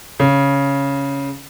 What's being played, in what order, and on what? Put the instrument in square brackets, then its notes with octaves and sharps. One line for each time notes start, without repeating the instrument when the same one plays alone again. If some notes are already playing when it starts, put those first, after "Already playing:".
[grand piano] C#3